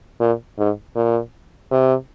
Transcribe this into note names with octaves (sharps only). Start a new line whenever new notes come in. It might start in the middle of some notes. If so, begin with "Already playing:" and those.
A#2
G#2
A#2
C3